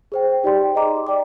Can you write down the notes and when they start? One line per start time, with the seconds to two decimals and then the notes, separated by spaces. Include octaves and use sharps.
0.12 G#4 C5 G5
0.43 D#4 G4 D5 G5 C6
0.75 G#4 D#5 A#5 D6
1.07 D5 G5 D6